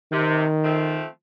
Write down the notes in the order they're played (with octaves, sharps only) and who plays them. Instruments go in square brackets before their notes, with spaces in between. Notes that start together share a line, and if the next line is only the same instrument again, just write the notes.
[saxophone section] C3 [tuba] D#3
[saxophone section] F3 A3 C4